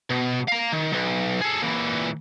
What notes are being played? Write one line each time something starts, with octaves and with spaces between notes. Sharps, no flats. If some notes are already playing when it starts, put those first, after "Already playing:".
B2
F5 A#5
D#3
B1
G#4 A4
A#2 E3